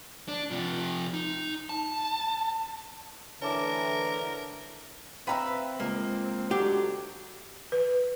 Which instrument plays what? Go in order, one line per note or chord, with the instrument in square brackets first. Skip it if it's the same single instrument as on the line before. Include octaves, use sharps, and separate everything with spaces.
[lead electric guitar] D4
C3 F3
D#4
A5
[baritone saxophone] D3 [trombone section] E3 A3 [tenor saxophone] A#4 [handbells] C#5 A5 D6
[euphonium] C4 [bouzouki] B4 C#5 E5 [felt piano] F5 G5 A#5
[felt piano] C#2 [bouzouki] A#3
[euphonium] D3 [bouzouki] F#3 [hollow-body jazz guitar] G4
[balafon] B4